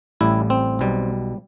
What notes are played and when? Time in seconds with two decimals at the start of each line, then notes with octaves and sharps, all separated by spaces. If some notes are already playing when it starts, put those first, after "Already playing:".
0.21 A1 A2 G3 E4
0.50 C4
0.79 B1 B2 G3